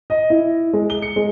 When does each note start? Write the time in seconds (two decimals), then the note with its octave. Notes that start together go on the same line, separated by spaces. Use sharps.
0.10 D#5
0.30 E4
0.73 G#3
0.90 G7
1.02 C#7
1.16 G#3